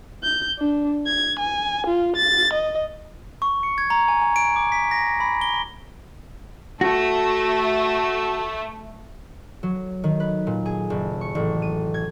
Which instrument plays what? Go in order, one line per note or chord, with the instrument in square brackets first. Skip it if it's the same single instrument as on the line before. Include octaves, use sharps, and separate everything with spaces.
[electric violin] G6
D4
G#6
G#5
F4
A6
D#5
[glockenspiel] C#6
C#7
G#6
A#5
G#5
G#5
D7
D6
B6
A#6
B5
G7
[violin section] A3 [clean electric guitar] F#4
[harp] F#3
D#3
B4
A#2
G#4
F#1
C#6
A1
D#7
G#6